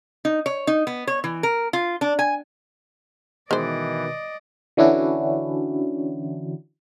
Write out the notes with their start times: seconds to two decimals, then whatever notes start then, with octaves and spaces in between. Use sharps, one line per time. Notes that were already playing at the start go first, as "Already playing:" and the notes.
0.25 D#4
0.46 C#5
0.67 D#4
0.87 B3
1.07 C#5
1.24 E3
1.43 A#4
1.73 F4
2.01 D4
2.19 G#5
3.51 B2 D#3 E3 G#3 C5 D5 D#5
4.77 D3 E3 C#4 D4 E4 F#4